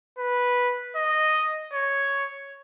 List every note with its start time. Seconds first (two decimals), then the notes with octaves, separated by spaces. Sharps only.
0.19 B4
0.96 D#5
1.73 C#5